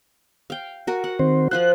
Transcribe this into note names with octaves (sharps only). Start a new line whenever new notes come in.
F5 G5
F#4 A#4
F#5
D#3 C4 C5
F3 F4 C5 F#6